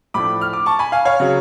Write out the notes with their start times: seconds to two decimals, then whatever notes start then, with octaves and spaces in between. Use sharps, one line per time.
0.14 A2 F3 A3 D4 B5 D6
0.41 F6
0.53 D6
0.66 A5 C#6
0.79 G#5 B5
0.92 F5 G#5
1.05 C#5 F5
1.20 C#3 F#3 C#4